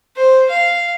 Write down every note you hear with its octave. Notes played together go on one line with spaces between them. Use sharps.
C5
F5